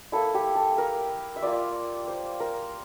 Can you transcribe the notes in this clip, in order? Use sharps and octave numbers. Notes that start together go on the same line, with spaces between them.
A#3 E4 A4
G4
A4
A#4
E5
A#3 F4 D5
C5
A#4